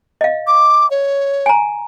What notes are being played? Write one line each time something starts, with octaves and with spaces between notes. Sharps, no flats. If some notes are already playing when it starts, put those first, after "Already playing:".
D#5 F5
D6
C#5
G#5 A#5